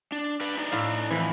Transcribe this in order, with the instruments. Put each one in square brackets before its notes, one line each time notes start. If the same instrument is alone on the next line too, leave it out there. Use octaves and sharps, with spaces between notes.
[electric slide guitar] D4
D4 B4
D4 D#4 D5
[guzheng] A2 F5
[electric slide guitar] F2 [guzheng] E3